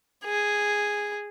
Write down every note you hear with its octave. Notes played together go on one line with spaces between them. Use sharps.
G#4